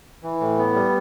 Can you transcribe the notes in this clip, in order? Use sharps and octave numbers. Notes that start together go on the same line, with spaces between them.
E3
A2
B3
G3